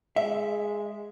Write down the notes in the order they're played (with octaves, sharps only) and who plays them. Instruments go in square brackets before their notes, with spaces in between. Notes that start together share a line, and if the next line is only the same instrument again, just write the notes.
[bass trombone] G#3 [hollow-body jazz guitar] E5